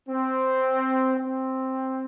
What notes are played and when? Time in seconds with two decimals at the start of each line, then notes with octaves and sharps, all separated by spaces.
0.09 C4
1.17 C4